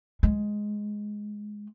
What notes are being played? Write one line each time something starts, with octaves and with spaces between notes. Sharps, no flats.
G#3